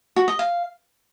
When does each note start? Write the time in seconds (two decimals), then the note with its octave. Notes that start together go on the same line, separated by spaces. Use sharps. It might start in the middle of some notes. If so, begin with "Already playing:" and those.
0.16 F#4
0.28 D#5
0.39 F5